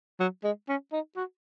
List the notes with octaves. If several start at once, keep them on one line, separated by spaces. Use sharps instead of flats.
F#3
G#3
C#4
D#4
F#4